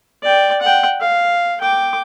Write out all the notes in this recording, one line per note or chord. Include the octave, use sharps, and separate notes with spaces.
D5 G5
F#5 G5
F5
G5 D6